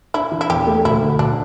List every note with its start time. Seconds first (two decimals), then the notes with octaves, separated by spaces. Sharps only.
0.14 D4 E4
0.32 E3
0.41 E4
0.49 E2 G4
0.67 A3
0.85 D2 E4
1.02 D3
1.19 D2 D4